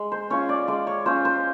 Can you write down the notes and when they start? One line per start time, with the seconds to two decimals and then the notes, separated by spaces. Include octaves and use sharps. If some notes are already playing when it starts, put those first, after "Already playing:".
Already playing: G#3
0.12 C5
0.30 C#4 F4 C#5
0.49 D5
0.68 G#3 D5
0.87 C#5
1.06 C#4 F4 C5
1.25 C5